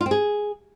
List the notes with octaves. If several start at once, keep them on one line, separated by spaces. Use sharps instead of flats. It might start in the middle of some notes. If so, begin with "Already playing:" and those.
F4
C4
G#4